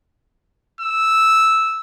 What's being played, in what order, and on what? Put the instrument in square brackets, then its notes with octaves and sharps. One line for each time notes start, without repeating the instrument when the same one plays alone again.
[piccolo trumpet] E6